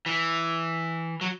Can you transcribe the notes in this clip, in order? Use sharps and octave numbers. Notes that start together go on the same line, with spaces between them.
E3
F#3